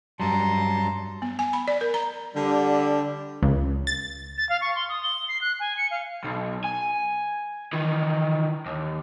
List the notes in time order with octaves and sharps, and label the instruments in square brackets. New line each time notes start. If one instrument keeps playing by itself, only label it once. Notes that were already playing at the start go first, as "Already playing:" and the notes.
[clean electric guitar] G2 F#3 G3 [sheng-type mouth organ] A5 A#5 C6
[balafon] B3
G#5
B5
D5
A#4
A#5
[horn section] D3 G3
[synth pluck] C#2
A6
[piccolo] A6
F5
C#6
C6
D#6
G7
C7
F#6
G#5
C#7
F5
[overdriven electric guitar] B1
G#5
D#3 E3
D#2